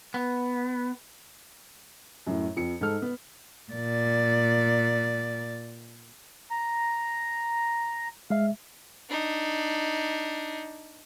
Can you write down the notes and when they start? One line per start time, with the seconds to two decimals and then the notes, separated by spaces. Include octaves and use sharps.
0.14 B3
2.27 F#2 A2
2.56 F2 C#7
2.81 G#2 A4 F6
3.02 B3
3.73 A#2 D5
6.51 A#5
8.30 G#3 E5 F5
9.10 D4 D#4